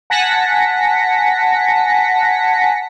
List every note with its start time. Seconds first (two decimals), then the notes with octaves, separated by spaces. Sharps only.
0.10 F#5 G#5 A5 A#6 B6 C#7